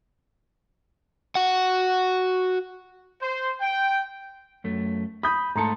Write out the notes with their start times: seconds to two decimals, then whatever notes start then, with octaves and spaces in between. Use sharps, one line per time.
1.35 F#4 F#5
3.21 C5
3.59 G5
4.64 F#2 A3
5.23 B5 D#6 G6
5.56 G#2 A3 A4 A#5 C6 C#7